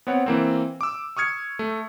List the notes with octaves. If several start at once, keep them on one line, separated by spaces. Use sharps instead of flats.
B3 C4 C#5 F#5
E3 A#3 C4
D6 E6
C#6 D#6 F6 G#6 C#7
A3